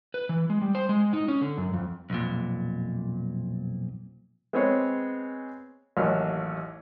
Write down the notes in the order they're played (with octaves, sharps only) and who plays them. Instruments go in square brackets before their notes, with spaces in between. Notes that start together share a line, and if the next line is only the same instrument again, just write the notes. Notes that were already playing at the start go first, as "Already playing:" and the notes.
[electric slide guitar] B4
E3
G#3
G3
C5
G#3
D#4
C#4
D3
F#2
F2
[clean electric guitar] B1 F2 A#2
[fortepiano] G#3 B3 C4 G#4 C#5
A1 D#2 F#3 F6